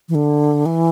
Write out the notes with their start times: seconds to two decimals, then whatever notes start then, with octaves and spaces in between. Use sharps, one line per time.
0.09 E3
0.15 D3
0.66 E3